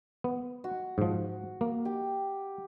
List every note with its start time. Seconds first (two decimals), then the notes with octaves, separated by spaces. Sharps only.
0.24 B3
0.64 F#4
0.98 G#2 F3
1.61 A#3
1.85 G4